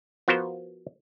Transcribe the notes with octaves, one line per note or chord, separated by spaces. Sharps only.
F3 B3 F#4 A#4 C5